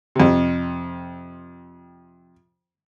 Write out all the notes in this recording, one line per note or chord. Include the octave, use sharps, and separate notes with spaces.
F2 C3